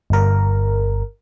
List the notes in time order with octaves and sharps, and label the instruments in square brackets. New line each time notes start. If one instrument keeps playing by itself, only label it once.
[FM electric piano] G1 A#4